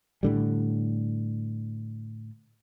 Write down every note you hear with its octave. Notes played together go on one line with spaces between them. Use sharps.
A2 D3 G3